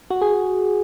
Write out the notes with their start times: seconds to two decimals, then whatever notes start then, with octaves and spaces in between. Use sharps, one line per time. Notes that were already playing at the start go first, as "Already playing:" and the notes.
0.10 F#4
0.21 G#4